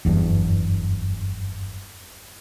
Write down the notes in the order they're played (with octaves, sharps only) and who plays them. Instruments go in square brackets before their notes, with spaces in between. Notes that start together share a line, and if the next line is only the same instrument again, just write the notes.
[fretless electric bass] F#1 E2 G2